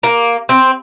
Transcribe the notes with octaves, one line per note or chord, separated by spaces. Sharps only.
A#3
C4